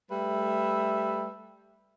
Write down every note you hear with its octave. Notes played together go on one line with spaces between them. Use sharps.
G3 A3 B4 E5